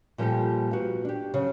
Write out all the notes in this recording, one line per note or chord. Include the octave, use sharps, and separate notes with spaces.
A#2 F3 G3 C4 G4 A4
B3 F#4 F5
D4 G4
C#3 F#3